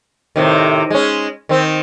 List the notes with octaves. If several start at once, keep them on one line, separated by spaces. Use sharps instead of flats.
A2 C3 D#3
G#3 C#4
D#3 C4